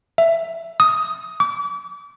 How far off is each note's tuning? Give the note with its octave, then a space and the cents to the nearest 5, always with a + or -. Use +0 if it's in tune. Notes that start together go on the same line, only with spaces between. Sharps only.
E5 +10
D#6 +10
D6 -35